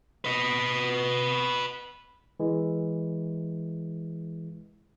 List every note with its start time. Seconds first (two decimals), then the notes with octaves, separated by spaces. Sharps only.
0.24 B4 D#5
2.40 E3 G#3